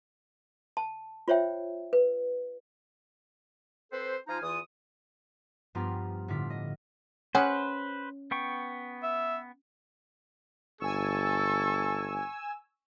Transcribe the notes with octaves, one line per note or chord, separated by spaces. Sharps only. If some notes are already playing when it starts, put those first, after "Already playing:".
A5
F4 C5 C#5 E5 G5
B4
C4 A4 B4 C5
F3 D#4 F4 F5 G#5 A#5
E2 E3 F4 D#6
G2 F3 B3 F4 G4 A#5
A2 D3 D4 F4 B6
D#5
C#4 G#4 B4 C5 F#5
B3 G5 C#6
E5
G1 A4 G#5 C#6 E6